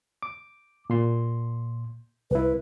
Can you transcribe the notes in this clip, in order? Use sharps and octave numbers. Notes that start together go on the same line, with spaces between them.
D6
A#2 C6
C2 E4 B4